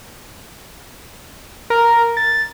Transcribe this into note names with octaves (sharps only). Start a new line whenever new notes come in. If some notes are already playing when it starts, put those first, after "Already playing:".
A#4
A6